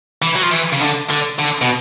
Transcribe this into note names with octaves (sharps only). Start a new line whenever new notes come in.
E3
F#3
F3
E3
C#3
D3
D3
D3
B2